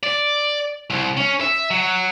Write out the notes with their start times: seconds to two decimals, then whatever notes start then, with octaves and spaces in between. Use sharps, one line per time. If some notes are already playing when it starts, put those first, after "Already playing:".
0.03 D5
0.90 C2
1.17 C#4
1.41 E5
1.71 F#3